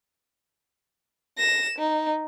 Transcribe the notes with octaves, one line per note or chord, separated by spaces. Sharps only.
A#6 E7
D#4